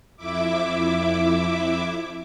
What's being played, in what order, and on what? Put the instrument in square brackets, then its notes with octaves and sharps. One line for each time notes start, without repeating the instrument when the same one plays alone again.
[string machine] F2 E4 E5 D6